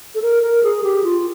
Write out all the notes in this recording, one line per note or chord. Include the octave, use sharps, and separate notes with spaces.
A4
A#4
A#4
G#4
G4
F4